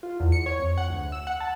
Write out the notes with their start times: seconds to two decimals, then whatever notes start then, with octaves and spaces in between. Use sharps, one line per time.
0.03 F4
0.20 E2
0.32 C#7
0.46 C#5
0.59 F2
0.78 F#5
0.90 D2
1.12 E6
1.27 F#5
1.40 A5